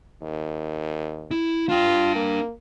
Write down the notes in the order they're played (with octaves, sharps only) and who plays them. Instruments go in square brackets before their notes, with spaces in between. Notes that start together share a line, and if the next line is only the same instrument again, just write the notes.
[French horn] D#2
[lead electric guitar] E4
[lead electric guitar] D4 G5 [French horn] F4
[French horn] A#3